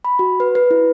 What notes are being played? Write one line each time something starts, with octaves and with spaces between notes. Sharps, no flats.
B5
F#4
B4
B4
E4